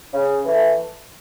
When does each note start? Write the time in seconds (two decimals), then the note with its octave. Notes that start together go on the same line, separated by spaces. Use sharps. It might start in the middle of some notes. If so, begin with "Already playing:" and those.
0.13 C#3
0.44 E3 A3